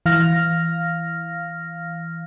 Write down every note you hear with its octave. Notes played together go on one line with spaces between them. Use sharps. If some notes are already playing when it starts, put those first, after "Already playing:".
E3 F5 F6 A#6